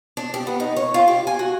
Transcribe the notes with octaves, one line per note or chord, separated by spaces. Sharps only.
D4
G4
B3
D#4
C#5
F4
G4
G#5
F#4